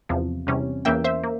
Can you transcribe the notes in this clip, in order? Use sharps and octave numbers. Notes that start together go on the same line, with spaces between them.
E2 C3 F3
E2 C3 G3 C#4
E2 E3 A#3 C#4 E5 G5
C5 E5
A#3